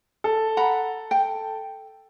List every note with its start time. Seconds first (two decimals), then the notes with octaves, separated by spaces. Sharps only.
0.24 A4
0.57 F#5 A#5 B5
1.11 G5